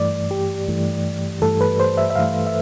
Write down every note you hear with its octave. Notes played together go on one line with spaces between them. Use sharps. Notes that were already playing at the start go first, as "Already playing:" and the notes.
Already playing: G2 E3 A3 D5
G4
G2 E3 A3
G2 E3 A3 A4
B4
C5
E5
E5
G2 E3 A3 F5
E5